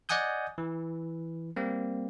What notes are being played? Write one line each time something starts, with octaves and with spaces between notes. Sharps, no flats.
D5 D#5 F#5 G#5 D#6 G6
E3
G3 A#3 C4